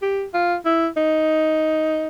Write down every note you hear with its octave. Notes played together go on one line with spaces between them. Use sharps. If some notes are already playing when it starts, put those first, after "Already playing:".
G4
F4
E4
D#4